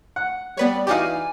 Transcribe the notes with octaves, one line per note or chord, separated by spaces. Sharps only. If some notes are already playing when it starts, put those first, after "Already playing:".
F#5
G3 B3 B4 C#5 D5
E3 D#4 F#4 G4 D5 F5 G#5